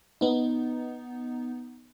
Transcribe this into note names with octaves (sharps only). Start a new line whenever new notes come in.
B3 D#4